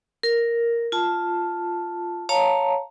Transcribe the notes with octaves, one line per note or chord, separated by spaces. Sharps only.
A#4
F4 A5
C#5 F5 A5 A#5